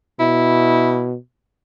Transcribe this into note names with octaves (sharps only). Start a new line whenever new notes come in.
B2 E4